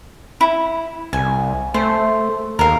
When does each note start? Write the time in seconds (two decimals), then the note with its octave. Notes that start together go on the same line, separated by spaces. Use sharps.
0.41 E4
1.13 C2 G#5
1.74 A3 C5
2.59 D#2 A#4 F5